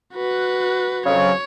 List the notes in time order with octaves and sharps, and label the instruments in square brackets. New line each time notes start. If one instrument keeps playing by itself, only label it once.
[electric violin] F#4 B4
[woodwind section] F2 C#3 F#3 [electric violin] C#5